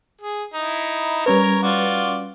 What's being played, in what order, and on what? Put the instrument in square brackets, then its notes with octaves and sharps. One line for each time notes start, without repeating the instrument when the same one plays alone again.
[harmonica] G#4
D#4 E4
[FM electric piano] G3 C#4 B4 [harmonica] A#4 C#5
[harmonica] F4 F#4 D5